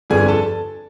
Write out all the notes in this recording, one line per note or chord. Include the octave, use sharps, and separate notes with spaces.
G1 F2 D3 G3 G#4 G#5
A4 A5